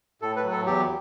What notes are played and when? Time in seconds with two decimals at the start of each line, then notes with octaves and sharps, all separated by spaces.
0.22 A2 A4
0.36 B4
0.43 F#3
0.51 A4
0.66 E2 G4